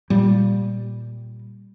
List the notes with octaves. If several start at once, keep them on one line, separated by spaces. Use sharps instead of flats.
A#2 G3